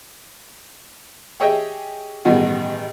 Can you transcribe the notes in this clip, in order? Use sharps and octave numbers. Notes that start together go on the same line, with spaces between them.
G4 G#4 C#5 D#5 E5 G5
A1 G2 B2 D#3 F#4 G#4